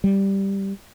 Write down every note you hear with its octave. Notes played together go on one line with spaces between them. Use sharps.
G3